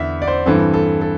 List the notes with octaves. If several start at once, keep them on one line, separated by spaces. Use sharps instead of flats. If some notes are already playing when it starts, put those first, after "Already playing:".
Already playing: E2 D3 E5
D5
C5
G2 E3 C4 A4
A4
A4